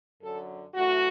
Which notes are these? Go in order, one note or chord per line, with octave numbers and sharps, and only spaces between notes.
F#2 D3 F#3 A4
F#2 E3 A3 F#4